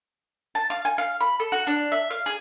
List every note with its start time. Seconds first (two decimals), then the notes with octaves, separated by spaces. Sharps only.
0.55 A5
0.70 F5
0.85 G#5
0.98 F5
1.21 B5
1.40 A4
1.52 F#4
1.67 D4
1.92 E5
2.11 F5
2.26 G#4